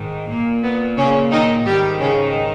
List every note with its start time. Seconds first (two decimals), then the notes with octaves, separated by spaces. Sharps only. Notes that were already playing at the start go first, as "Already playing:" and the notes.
Already playing: G#2 D#3
0.29 A#2 A#3
0.64 B3
0.97 C#3 C#4
1.31 D#3 D#4
1.66 G#2 D#3 G3 G4
2.00 C#3 C#4